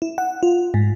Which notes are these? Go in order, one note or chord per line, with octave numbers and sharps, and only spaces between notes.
E4
F#5
F4
G#2